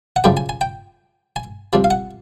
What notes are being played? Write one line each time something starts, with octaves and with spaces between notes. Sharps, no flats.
F#5
F#2 C#3 F3 A3 G5
G#5
G#5
G5
G#5
C2 C3 F3
F5
F#5